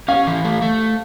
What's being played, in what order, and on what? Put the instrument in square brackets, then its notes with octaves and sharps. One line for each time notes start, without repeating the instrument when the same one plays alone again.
[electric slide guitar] C#4 [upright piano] F5
[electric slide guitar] E3
A3
A3